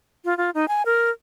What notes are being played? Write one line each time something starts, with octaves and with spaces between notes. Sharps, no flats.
F4
F4
D#4
G#5
A#4